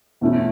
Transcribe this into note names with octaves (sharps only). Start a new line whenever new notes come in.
E2 B2 A3 C#4 E4